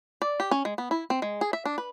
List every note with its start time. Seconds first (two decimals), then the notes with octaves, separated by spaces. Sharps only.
0.22 D5
0.40 G4
0.51 C#4
0.65 G#3
0.78 B3
0.91 E4
1.10 C4
1.22 G#3
1.41 G#4
1.53 E5
1.65 D4
1.78 B4